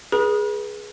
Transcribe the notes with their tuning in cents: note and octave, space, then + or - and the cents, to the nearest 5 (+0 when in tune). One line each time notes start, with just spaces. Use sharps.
G#4 +5 B4 -30 B5 -40